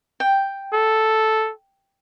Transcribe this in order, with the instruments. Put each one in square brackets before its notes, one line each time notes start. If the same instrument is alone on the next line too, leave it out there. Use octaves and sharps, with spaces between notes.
[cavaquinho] G5
[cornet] A4